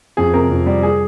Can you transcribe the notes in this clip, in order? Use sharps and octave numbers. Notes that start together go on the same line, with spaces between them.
F2 G#4
C3 A#4
F2
G3
G#4